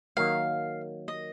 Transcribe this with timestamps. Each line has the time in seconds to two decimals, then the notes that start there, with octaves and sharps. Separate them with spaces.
0.17 D#3 F#3 A#3 F5
1.08 D#5